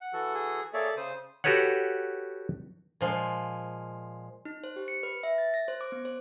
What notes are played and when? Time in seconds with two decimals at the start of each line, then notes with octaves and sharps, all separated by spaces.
0.01 F#5
0.13 E3 F#4 A4
0.34 G#4
0.73 A#3 G#4 A4 C#5 D5 E5
0.97 C#3 C5 D#6
1.44 F#4 G4 A4 B4 C#5 F#5
3.01 A#2 F3 G#3
4.45 D#4
4.64 C5
4.76 G4
4.88 C#7
5.03 B4
5.23 E5
5.38 A6
5.54 A#6
5.68 C5
5.81 D6
5.92 B3
6.05 C5